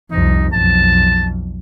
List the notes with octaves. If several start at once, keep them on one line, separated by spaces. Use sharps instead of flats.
C2 F2 D#4
B1 F2 A5